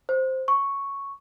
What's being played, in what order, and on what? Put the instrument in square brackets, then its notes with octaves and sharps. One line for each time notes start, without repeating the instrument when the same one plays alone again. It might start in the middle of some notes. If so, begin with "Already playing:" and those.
[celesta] C5
C#6